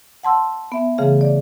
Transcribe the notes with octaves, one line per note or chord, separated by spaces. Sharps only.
F#5 A5 C6 E6
B3 E5
C#3 E3 A3 G#4 F5
D5